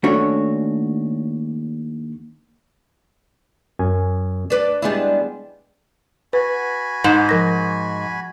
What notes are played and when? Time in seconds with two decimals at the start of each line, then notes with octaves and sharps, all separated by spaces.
0.03 D#2 A3 C#4 D4 F#4 C#5
3.79 F#2 G#5
4.50 D4 B4 D5
4.82 G3 G#3 B3 D4 E4
6.33 F#4 B4 G#5 B5
7.04 G#2
7.29 F3 A#4 A#6